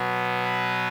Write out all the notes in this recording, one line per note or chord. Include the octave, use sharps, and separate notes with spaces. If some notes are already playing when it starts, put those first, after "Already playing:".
Already playing: B2 F#3 B3
B4